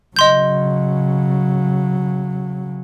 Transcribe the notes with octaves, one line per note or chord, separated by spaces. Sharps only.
C#3 F#3 D#5 C6 G6